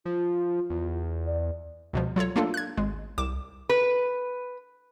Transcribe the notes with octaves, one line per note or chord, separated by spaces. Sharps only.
F3 F4
E2
D5
C#2 B2 F3
F#3 F4 A4 C#5
A3 A#3 D4 F4 A4
F#6 G#6
G#1 G#3
C2 D6 E7
B4